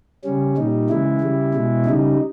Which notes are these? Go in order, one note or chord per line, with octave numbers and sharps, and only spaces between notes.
C#3 G3 C#4
A#2 G3 D#4
C#3 E3 G#3 E4
C#3 G3
B2 G#3
C#3 G3 D#4